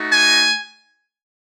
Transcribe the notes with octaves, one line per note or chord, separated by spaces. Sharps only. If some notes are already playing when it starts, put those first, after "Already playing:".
Already playing: A3 D#4 F#4
G#5